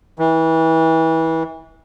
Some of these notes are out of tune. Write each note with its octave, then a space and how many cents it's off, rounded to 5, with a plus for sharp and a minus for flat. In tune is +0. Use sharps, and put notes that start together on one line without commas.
E3 -30